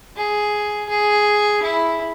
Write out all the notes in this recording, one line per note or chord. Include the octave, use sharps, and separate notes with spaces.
G#4
G#4
E4